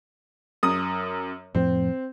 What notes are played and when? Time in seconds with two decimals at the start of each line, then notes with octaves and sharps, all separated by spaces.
0.63 F#2 D#6
1.55 F2 A2 F3 C4